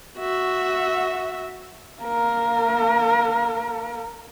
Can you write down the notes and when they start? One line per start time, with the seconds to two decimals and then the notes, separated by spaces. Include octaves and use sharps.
0.18 F#4 E5
2.03 A#3 A#4